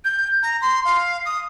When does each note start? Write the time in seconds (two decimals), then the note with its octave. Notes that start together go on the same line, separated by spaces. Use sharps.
0.05 G6
0.43 A#5
0.61 C6
0.85 F5
1.25 D#6